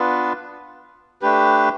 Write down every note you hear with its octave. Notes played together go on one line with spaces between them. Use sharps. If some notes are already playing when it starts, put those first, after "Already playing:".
Already playing: B3 D4 F4 B4
A3 D4 G4 B4